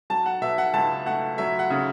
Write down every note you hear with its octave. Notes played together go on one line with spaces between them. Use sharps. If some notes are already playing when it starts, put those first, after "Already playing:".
F#3 A5
F#5
B2 E5
F#5
C#2 A5
A3 F#5
F#3 E5
F#5
C#3